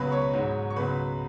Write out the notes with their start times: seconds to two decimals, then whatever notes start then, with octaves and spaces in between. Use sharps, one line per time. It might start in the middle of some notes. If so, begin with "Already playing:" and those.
Already playing: C#2 B2 F#3 B4 B5
0.12 C#5 C#6
0.33 G#2 F#3
0.70 C#6
0.76 C#2 B2 F#3 B4 B5